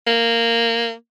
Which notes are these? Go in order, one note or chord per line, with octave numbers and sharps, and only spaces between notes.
A#3